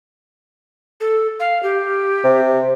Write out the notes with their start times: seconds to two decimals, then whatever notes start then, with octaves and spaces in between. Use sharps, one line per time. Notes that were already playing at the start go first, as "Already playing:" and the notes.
1.00 A4
1.40 F5
1.63 G4
2.24 C3